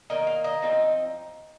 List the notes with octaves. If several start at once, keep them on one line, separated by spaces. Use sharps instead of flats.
D#3 A#3 D#4 D#5
F5
D#5
F3 C4 D#4